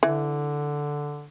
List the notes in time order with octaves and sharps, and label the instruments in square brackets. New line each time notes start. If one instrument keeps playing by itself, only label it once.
[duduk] D3 [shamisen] E3